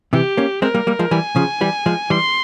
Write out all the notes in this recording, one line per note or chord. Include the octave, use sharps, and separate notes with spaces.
C3 E3 G4
A#3 C#4
G#3 C4 A#4
G3 A#3
G3 A#3
F3 G#3
E3 G3 G#5
C#3 F3
E3 G3
F3 G#3
E3 G3 C6